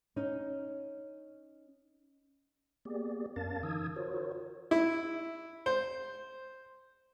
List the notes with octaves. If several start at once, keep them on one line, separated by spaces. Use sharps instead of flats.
C#4 D#4
A#3 B3 G4 G#4 D5
F#2 C#4 A#4 F5 A5 A6
D3 E3 D#4 D#6 E6 G#6
F4 F#4 A#4 C5 C#5
E4
C5